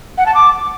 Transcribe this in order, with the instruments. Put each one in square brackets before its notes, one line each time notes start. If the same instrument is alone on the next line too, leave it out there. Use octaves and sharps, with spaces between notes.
[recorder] F#5
A5
D6